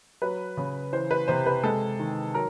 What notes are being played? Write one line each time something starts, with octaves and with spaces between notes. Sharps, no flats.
F#3 B4
C#3
E3 C5
B4
C3 C5
B4
G#3 A4
D#3
F#3 A#4